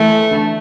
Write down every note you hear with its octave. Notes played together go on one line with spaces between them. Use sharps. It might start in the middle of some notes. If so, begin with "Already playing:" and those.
Already playing: E3 A3
D3